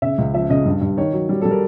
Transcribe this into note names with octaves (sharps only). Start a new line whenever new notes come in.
C#3 E5
C#2
F3 E5
C#3 D#5
G2
G2
D#3 C#5
F#3
G3
G3 A4
A#4